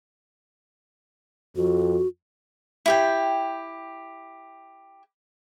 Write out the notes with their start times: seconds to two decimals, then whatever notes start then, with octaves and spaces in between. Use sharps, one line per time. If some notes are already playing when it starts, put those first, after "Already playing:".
1.56 F2 F#4
2.86 E4 G4 G5